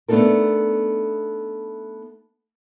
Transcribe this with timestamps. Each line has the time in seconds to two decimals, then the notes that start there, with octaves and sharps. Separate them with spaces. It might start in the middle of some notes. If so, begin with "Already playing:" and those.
0.08 A3 B3 D4 D#4 A4 A#4